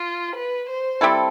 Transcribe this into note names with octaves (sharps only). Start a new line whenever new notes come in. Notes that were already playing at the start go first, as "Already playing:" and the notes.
Already playing: F4
B4
C5
G3 C4 E4 A4